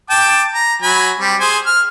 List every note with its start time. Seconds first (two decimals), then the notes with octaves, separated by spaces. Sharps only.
0.10 G5 A5 D6
0.55 A#5
0.82 F#3 G#5 B5
1.20 G3 C4
1.40 G#4 C5 G#5
1.67 F6